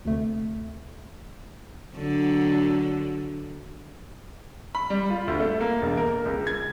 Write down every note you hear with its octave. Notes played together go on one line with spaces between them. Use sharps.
D2 C3 A3
D3 F#3
B5
G3
F4
D2
A3
A#3
E1
A#4
C#2
G#6